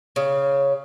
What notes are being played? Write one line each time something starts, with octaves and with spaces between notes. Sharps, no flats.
C#3